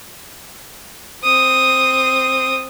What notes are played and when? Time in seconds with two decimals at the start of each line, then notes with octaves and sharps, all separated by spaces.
1.24 C4 D#6